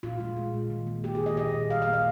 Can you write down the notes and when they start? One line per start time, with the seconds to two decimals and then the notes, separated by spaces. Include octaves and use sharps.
0.03 A#2 F4
0.20 G#3
0.36 G#3
0.54 A#2
0.70 D#3
0.87 A#3
1.04 A#3 G4
1.15 G#4
1.20 D#3
1.26 D#5
1.37 A#2 D#5
1.54 A#2
1.70 G3 F5
1.82 F5
1.87 A#3
1.93 D#5